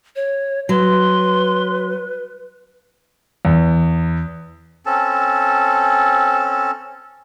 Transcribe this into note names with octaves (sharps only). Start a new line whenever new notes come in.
C#5
F#3 B4 C6
E2
C4 C#4 A4 A5